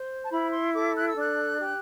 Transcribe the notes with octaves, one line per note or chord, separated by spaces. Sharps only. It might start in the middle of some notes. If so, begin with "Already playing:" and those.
Already playing: C5
A5
E4 B5
C6
A4 D6
F#6
E6
D4 F#6
G4